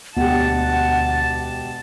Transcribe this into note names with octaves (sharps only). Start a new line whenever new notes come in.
E1 D2 G4 F#5 A5